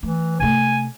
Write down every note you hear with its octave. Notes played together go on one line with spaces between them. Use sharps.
E3 A3
C3 A3 G#5